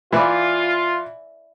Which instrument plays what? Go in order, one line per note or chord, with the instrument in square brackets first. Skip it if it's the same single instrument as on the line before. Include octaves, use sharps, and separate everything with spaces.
[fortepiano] E3 [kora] E4 B4 D5 [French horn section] F4